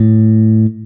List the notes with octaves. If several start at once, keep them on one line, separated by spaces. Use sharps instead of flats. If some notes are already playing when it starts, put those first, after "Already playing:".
Already playing: A2